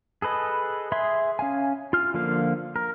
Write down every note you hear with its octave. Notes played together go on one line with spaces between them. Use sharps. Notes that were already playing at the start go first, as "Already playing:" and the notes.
G#4 A4 B4 D#5
G#4 E5 C6 D#6
C#4 F5 G#5
F4 F6
D3 F3 A#3 F5
A#4